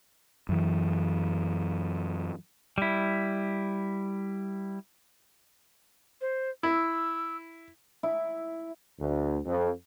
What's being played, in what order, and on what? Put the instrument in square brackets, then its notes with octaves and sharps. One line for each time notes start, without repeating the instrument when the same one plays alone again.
[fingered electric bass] F#2 E3
[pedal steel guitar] G3 E4
[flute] C5
[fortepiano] E4 [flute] E6
[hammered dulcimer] E4
[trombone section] D2
F2